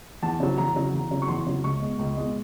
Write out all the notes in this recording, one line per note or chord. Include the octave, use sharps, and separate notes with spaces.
E2 A5
C#3 F#3
E2 A#5
C#3 F#3
E2
C#3 F#3
C#6
E2 C6
C#3 F#3
C#2 C#6
B2 G#3
C#2
B2 G#3